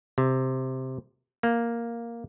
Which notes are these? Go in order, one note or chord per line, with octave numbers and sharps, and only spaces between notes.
C3
A#3